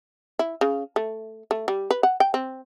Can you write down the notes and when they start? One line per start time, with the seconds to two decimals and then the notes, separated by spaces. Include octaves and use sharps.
0.39 E4
0.61 C#3
0.96 A3
1.51 A3
1.68 G3
1.91 B4
2.03 F#5
2.20 G5
2.34 C4